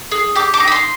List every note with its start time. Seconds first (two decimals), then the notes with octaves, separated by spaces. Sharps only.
0.12 G#4
0.35 G4 D6
0.54 D6
0.60 D#4
0.68 B5
0.72 C6